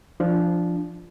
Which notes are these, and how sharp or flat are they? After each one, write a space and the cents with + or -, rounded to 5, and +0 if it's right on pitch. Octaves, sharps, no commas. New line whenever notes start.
F3 -10 D4 +0